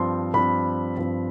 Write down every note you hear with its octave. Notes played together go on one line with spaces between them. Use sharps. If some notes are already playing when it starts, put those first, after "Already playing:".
Already playing: G2 F3 C4 C6
G2 F3 C4 B5
G2 F3 C4